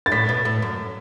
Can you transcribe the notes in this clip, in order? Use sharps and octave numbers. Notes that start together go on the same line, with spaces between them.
A6
A2 B6
B2
A2
F#2